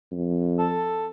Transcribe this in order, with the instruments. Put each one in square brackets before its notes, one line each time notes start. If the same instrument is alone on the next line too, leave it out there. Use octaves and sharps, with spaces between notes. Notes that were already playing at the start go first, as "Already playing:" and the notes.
[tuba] F2
[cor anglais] A4